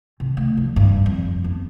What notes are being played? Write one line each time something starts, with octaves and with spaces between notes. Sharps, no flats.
C3
A3
F3
G2
F2
B3